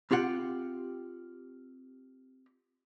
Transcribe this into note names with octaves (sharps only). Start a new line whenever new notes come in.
C4 F4 G4 F#5